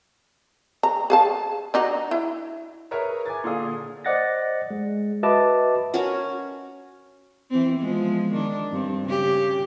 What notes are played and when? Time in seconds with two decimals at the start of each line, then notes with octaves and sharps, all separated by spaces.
0.83 A#5
1.10 G#4 F5 A5
1.74 D4 D#4 F#4
2.11 E4
2.91 G#4 A#4 B4 C#5 E5 A#5
3.26 G#5 D6 G#6 A6
3.44 A#2 D3 G#4 D5 F5 D#6
4.05 C5 D5 D#5 F#5 A6 A#6
4.70 G#3
5.23 F#4 B4 D#5 E5 A5 D6
5.94 C#4 F#4 A#4
7.50 E3 C4
7.79 F3 G#3 B3
8.32 D#3 D4
8.72 G2 C4
9.05 C#3 G4